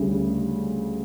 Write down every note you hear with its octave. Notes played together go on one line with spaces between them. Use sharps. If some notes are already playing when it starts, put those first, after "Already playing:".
Already playing: D2 C#3 G3